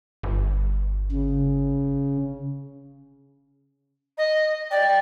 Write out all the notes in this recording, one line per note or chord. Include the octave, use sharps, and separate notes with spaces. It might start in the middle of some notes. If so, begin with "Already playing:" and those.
G1
C#3
D#5
D5 G5